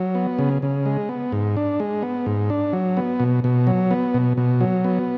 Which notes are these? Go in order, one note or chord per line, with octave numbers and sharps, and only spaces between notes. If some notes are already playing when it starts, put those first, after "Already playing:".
Already playing: F#3
B3
C#3
C#3
G#3
B3
G#2
D4
G#3
B3
G#2
D4
F#3
B3
B2
B2
F#3
B3
B2
B2
F#3
B3